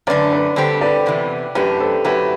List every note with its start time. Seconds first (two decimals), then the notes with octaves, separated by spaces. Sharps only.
0.07 F#2 D3 A3 B4 D5
0.32 B4 D5
0.56 D3 G3 C4 G4 A4 C5
0.81 B4 D5
1.06 E2 C3 E3
1.55 F#2 F#3 A3 D4 G4 B4
1.80 A4 C5
2.05 F#2 F#3 A3 E4 G4 B4